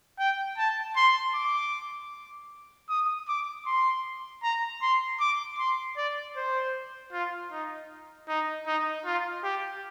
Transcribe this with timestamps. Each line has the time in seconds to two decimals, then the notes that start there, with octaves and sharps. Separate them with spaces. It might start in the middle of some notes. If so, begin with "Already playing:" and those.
0.19 G5
0.58 A5
0.96 C6
1.35 D6
2.89 D#6
3.28 D6
3.66 C6
4.43 A#5
4.82 C6
5.20 D6
5.58 C6
5.97 D5
6.36 C5
7.13 F4
7.52 D#4
8.28 D#4
8.67 D#4
9.05 F4
9.44 G4